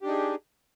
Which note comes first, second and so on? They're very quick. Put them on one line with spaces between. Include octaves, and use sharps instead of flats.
G4 D4 D#4 G#4